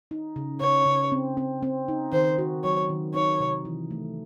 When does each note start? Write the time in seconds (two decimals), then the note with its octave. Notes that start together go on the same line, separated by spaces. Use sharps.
0.11 D#4
0.36 C#3
0.61 C#3 C#5
0.86 C#3
1.12 C4
1.37 C4
1.63 C4
1.88 D#4
2.13 D#3 C5
2.38 F#4
2.64 F#3 C#5
2.89 D#3
3.14 D#4 C#5
3.40 C3
3.65 E3
3.91 A3